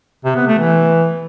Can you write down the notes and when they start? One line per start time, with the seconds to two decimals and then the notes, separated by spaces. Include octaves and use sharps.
0.25 C3
0.36 B3
0.47 A3
0.58 E3